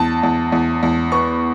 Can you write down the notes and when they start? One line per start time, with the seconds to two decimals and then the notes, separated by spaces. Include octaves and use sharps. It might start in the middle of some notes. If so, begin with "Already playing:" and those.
Already playing: E2 A5
0.23 E2
0.52 E2
0.83 E2
1.12 B3 C#6